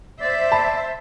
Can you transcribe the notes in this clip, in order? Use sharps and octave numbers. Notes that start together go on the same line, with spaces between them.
C5 D5 E5
A5 B5